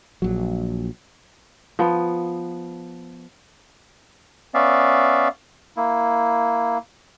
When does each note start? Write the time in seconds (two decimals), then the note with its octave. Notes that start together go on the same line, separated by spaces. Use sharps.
0.22 A#1 F#3
1.79 F3 B3
4.54 B3 C#4 D5 E5 F5
5.77 A#3 E4